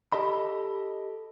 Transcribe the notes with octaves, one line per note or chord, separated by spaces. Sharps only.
G4 A4 D#5 B5